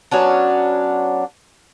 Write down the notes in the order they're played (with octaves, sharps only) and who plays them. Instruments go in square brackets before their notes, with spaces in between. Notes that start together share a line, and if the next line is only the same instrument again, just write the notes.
[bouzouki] F#3 B3 C#4 D4